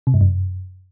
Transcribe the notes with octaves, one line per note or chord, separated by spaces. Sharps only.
C3
G2
F#2